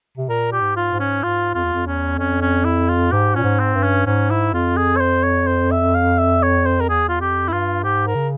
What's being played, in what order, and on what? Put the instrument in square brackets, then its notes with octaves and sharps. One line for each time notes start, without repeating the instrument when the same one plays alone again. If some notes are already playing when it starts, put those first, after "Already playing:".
[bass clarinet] C3
[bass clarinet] A#2 [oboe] A#4
[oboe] G4
[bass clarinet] G#2
[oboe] F4
[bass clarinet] G#2
[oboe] C#4
[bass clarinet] G#2 [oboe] F4
[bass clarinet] F2 [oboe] F4
[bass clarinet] E2
F2
[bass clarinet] E2 [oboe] C#4
[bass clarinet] F2 [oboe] C#4
[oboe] C#4
E4
F4
[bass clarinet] G#2 [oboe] G4
[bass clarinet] A#2 [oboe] C#4
[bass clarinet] G#2
[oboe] C4
[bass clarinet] G2
[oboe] C#4
[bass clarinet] G#2 [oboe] C#4
[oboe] E4
[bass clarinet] F2 [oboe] F4
[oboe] G#4
C#5
C5
C#5
C5
E5
F5
E5
C#5
C5
A#4
[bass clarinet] E2 [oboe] G#4
[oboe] F4
[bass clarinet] F2 [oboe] G4
[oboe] E4
[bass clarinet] G2 [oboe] F4
[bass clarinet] G#2 [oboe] G4
[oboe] A#4
[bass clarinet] C#3